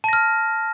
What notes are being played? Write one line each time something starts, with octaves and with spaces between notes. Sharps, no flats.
A5 F6 A#6